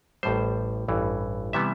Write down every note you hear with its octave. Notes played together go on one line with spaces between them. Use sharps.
A1 A2 G3 C5
A1 G2 E3
C3 E3 G3 B3 E5